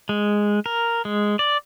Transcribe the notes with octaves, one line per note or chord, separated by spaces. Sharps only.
G#3
A#4
G#3
D5